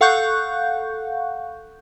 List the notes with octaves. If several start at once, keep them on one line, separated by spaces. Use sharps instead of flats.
A4 F5 F#5 C#6 F#6 G6